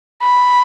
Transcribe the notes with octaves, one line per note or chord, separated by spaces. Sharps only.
B5